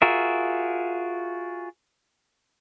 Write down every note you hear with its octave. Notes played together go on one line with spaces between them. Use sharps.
F4 F#4 G#4 A#4 E5